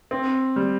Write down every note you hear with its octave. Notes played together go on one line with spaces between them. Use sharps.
C4
G3